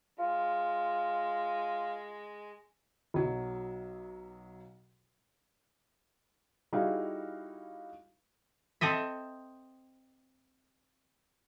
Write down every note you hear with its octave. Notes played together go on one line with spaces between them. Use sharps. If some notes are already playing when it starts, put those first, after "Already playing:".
G#3 F4
B1 F#3
G3 D#4 E4 F#4 G#4 F5
C4 A4 D#5 E5